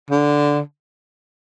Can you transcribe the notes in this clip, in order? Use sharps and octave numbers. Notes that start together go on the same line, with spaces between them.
D3